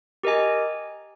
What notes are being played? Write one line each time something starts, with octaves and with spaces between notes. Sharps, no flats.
G4 A#4 D#5 G#5